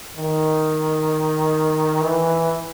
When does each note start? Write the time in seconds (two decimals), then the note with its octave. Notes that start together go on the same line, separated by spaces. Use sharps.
0.16 D#3
2.01 E3